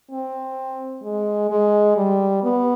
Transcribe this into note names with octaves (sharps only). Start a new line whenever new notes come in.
C4
G#3
G#3
G3
B3